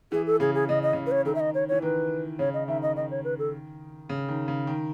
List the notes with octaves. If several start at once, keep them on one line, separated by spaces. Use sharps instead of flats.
E3 G#4
A4
C#3 G#4
G#4
C#3 D#5
D#5
C#3
B4
C#5
D#3 A4
E5
D#5
C#5
E3 C#5
D#3 B4
C#3 C#5
D#5
D#3 E5
D#5
D#3 D#5
C#5
B4
A4
C#3
D#3
C#3
D#3